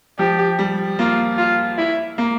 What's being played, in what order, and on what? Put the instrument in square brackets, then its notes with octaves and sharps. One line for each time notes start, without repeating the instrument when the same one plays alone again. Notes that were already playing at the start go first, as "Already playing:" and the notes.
[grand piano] F3 [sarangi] G4
[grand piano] G3
[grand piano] A#3 [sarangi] F4
[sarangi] F4
E4
[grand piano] A#3